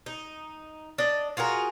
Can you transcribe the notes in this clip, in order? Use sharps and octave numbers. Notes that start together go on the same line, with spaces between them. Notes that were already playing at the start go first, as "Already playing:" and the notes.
D#4
D4 D#5
F4 F#4 G#4 A#4